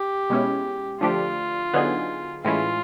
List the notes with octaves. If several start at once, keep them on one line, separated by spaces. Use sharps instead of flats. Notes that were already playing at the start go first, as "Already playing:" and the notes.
Already playing: G4
B2 G#3 C#4 E4
D3 F3 A3 D4 F4 G4
D3 F#3 B3 D#4 G#4
A2 E3 G#3 C#4 E4 F4